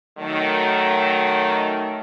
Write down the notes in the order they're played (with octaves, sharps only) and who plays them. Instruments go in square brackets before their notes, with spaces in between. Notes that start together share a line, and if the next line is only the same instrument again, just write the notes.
[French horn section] D#3 F#3 A3